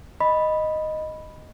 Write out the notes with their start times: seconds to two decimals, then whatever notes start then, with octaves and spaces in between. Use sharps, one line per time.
0.21 D#5 B5